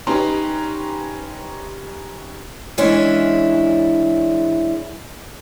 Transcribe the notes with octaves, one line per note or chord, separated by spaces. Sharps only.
C#4 D#4 G4 B4 A#5 C6
E3 G#3 C#4 D4 E4